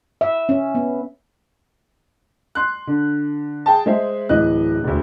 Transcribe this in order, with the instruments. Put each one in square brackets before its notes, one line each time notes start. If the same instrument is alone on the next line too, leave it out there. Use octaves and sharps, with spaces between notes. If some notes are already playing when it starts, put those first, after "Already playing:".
[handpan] E5
C#4
B3
[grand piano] C6 F#6
D3
G#4 G5 A5
G#3 G#4 C5 E5
D1 E3 D#5 F#6
E1 D2